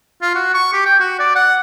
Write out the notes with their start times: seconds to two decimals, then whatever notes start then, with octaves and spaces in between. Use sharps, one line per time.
0.22 F4
0.35 F#4
0.54 C#6
0.73 G4
0.86 G5
1.00 F#4
1.20 D5
1.36 F#5